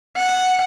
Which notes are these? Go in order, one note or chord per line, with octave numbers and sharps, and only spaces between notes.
F#5